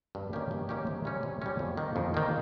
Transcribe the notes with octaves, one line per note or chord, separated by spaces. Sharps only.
G2
D#3 A#3 C#4 G4
G2
D#3 A#3 C#4 G4
C3
G3 C#4
C3
G3 C#4
F2
D#3 A#3
F2
D#3 A#3